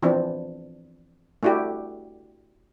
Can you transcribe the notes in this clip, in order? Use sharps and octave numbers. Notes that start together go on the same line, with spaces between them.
E3 F3 C4 D4
A3 D4 E4 F#4 G4